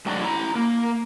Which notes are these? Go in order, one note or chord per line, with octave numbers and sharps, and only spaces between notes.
G#2 F#3 A3 D4 F#4
E4 A#5
A#3 A#4